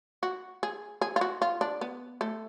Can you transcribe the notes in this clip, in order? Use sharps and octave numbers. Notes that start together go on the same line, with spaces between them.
F#4
G#4
G#4
F4
F#4
F4
D4
B3
A3